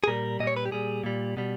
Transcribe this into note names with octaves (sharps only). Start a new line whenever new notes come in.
G#4
A#2 G3 A#4
A#2 G3 C#5 D#5
B4
G4
A#2 G3 G#4
A#2 G3
B2 G3